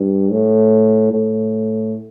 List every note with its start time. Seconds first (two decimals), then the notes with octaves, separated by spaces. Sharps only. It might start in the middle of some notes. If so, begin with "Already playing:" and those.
Already playing: G2
0.31 A2
1.12 A2